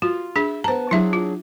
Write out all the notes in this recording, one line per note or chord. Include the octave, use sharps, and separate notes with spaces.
F4 F#4
D4 G#4 E5
B3 C5 A5 A#5
F#3 D4 E4 G#4 E5
F4